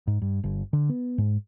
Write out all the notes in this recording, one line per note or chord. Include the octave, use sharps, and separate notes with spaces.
G#2
G2
G1
D3
B3
G#2